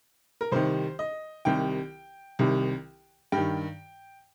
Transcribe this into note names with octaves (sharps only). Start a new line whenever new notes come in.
A#4
C2 C3 D#3 C5
D#5
C2 C3 D#3 G5
C2 C3 D#3
G2 D#3 G5